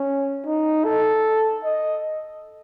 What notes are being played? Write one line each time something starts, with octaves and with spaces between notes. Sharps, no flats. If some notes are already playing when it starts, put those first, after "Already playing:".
Already playing: C#4
D#4
A4
D#5